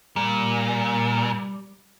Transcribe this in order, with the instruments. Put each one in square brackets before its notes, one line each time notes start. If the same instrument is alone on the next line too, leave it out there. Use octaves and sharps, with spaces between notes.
[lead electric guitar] A#2 [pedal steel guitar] G3